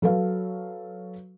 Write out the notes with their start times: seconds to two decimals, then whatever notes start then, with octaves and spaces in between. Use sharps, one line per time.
0.02 F#3 A4 B4 F5